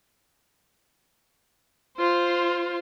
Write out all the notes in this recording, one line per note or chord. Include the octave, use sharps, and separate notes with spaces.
F4 C5